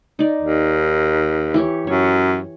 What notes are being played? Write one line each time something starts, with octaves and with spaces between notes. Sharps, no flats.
D#4 D5
D#2
E3 G4 C#5
F#2 C#5